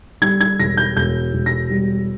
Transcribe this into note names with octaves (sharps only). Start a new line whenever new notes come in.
G3 G#6
G#6
E1 A#6
G6
E1 G6
E1
A#6
G3